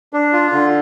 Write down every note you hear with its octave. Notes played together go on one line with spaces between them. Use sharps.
D4
F4
D3